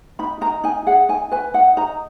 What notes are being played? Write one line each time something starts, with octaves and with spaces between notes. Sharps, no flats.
D#4 B5
D#4 A#5
D#4 G#5
G#4 F#5
D#4 G#5
B4 G#5
D#4 F#5
D#4 A#5